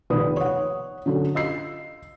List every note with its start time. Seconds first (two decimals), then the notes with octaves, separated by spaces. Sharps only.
0.10 F1 A#1 D#3 B3 B5 D#6
0.37 C#5 F#5
1.06 D3 F#3 C#4 A4
1.35 F4 D#5 E6 C7